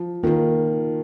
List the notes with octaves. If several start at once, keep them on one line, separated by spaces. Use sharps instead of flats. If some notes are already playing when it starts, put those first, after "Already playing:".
Already playing: F3
D#3 A#3 F4 A#4